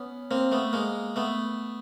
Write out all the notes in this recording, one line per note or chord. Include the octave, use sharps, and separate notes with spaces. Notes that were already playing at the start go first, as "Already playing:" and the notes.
Already playing: B3 C#4
A#3 C4
A3 B3
G#3 A#3
A3 B3